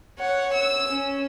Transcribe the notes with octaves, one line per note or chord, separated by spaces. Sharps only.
C#5 F#5
E6
C#4